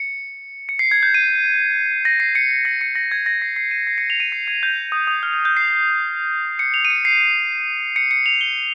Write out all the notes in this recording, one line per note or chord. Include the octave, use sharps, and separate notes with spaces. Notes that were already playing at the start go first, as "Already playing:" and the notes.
Already playing: C#7
C#7
C7
G#6
G6
D#7
A#6
C7
C#7
C7
A#6
C#7
A#6
G#6
A#6
C7
C7
D#7
C7
C#7
F7
D#7
C7
G#6
G6
D#6
D#6
F6
G6
G6
C7
C#7
F7
D#7
C#7
C7
C#7
C#7
F7
G7